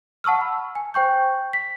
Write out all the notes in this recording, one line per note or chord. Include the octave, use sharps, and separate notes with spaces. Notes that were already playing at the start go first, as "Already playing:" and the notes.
F#5 A5 C#6 E6 F6
B5
G#5
C5 G5 C#6 G6
B6